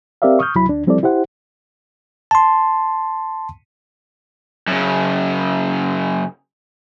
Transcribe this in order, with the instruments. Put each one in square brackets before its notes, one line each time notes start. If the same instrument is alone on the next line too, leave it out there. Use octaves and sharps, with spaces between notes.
[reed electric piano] C4 G4 A#4 D5 E5 F5
C#6 D#6 F6 G6
C2 F#3 E4 B5
D2 D4
F3 G3 C4 E4 A4 D5
E4 G4 C5 F#5
[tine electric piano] A5 C6
[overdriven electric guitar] F#2 C#3